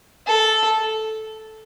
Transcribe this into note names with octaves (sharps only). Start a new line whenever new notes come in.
A4